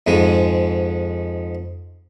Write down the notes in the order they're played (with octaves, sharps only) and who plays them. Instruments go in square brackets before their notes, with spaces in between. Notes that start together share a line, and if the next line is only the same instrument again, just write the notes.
[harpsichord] F2 G#2 G#3